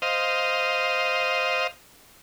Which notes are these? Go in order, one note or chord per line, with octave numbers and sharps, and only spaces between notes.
C5 D#5 F5